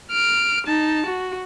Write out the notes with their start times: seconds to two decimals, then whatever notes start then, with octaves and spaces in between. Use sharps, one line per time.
0.11 F6 D7
0.67 D#4 A5
1.06 F#4